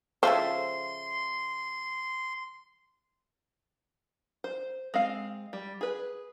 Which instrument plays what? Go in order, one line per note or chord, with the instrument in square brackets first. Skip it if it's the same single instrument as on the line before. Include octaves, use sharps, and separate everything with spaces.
[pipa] C#3 A4 E5 [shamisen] F3 C5 [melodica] C6
[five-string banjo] C5
G#3 C4 F5
G3
G#4 B4